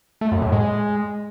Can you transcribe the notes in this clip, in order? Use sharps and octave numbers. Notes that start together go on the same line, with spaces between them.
A3
F#2
A2
G#3